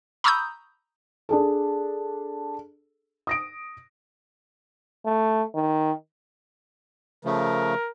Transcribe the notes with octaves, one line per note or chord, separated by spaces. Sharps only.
A#5 B5 C#6 D#6 E6 G6
D4 G#4 A4
D#6 A#6 D7
A3
D#3
C#3 F3 A3 A#4